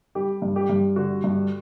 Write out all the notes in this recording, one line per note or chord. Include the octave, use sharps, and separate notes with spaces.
G3 G4
G2
G4
G2
D3 F#4
G2